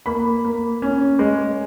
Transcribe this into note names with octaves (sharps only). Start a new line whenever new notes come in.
A#3 B5
A#3
C#4
G#3